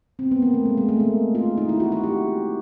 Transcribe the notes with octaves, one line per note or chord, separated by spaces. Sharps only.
C4
B3
A#3
A3
G#3
G#3
A3
A#3
F4
D#4
E4
F#4
F#4
G4